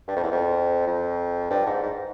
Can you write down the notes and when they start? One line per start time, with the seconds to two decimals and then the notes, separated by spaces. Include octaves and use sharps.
0.08 G2
0.17 F2
0.24 E2
0.32 F2
0.87 F2
1.51 G2
1.67 G#2
1.83 G#2